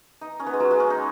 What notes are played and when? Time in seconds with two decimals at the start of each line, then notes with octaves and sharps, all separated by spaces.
0.21 D#4
0.40 C#4
0.46 B3
0.53 G#3
0.60 F#3
0.71 G#3
0.80 C#4
0.90 D#4